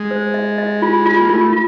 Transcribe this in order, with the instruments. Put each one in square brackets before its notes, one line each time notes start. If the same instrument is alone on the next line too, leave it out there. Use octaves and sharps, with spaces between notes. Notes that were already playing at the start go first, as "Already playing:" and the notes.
Already playing: [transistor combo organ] G#3
[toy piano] C5
D#5
D#5
F4
F4
[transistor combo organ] A#3
[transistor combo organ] A3 [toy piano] F4
[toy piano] F4